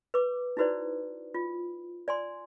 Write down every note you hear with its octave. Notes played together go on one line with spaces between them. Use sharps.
B4 D6
D#4 E4 F#4 B4 C5 D5
F4
D5 G#5 C6